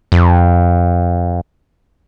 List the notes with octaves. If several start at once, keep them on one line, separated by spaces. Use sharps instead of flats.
F2